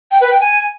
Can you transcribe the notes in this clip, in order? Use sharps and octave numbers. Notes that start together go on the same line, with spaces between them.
G5
B4
G5
G#5